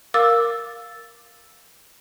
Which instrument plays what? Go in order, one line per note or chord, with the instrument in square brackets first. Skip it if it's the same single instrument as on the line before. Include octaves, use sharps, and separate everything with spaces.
[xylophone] A#4 F5 D6 E6 A6